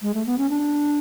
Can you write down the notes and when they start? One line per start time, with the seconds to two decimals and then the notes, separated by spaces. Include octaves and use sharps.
0.02 G#3
0.14 A3
0.26 B3
0.38 C#4
0.49 D4